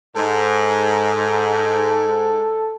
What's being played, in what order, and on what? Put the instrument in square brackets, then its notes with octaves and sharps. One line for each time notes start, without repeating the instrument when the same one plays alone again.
[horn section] G#2 [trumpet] A4